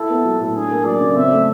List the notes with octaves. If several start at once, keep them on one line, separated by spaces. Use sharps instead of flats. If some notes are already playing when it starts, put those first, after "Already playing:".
Already playing: E4 A4
B3
F#3
A2
D4 G#4
A#3
F#3 D5
C#3
C4 E5
A3